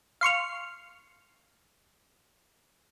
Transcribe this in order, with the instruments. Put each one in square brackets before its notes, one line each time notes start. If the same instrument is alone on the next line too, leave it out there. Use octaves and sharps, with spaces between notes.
[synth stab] F5 C6 C#6 F6